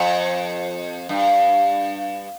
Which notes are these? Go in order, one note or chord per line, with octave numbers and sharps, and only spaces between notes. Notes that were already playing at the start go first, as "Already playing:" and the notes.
Already playing: F2
G2